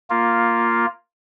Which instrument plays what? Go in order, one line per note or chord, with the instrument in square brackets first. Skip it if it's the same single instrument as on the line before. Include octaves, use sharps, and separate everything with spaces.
[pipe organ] A#3 F4